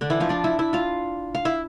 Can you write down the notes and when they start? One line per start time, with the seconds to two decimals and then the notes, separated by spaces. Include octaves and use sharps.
0.01 D3 D4
0.10 E3 E4
0.20 F3 F4
0.29 D4 D5
0.44 E4 E5
0.59 E4 E5
0.73 F4 F5
1.35 F5
1.45 E4 E5